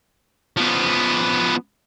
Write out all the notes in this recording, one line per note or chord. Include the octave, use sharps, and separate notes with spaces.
F3 B3